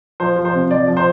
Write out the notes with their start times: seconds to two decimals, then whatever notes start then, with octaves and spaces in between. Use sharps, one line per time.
0.20 F3 C5
0.36 F3
0.45 C5
0.54 C3
0.71 F3 D5
0.88 F3
0.97 C5